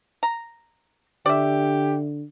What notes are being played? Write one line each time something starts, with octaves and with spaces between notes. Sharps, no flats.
A#5
D3 G4 D5 E5